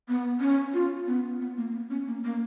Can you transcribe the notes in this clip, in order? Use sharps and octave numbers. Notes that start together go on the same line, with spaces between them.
B3
C#4
F4
B3
B3
A#3
B3
C#4
A#3
A#3